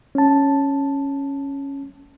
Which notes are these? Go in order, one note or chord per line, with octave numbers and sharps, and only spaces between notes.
C#4 A5